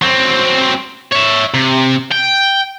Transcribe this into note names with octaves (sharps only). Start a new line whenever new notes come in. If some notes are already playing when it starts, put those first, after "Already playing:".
F#3 C4
C#5 E5
C3
G5